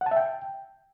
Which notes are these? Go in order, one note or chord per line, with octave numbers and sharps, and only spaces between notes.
F#5
A5
E5
G5